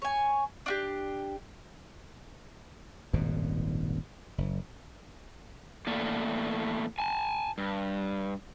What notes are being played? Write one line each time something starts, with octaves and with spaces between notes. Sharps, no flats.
C#5 G#5
D4 F#4 G4
D#1 G#1 F#2 B2
F#1
E2 A2 A3 A#3 D5
G#5 A5
G2